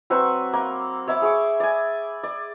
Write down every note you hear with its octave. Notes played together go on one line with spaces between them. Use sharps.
F#3 C4 B4 C#6
A#3
C#5 E5 B5 D6
G#4 C#6 D6
D5 G#5
D5